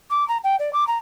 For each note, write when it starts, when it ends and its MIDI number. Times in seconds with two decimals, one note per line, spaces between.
0.10 0.26 86
0.28 0.37 82
0.43 0.55 79
0.59 0.69 74
0.72 0.86 86
0.87 0.98 82